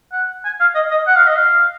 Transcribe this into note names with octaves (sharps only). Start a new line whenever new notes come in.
F#5
G#5
F5
D#5
D#5
F#5
F5
D#5
F5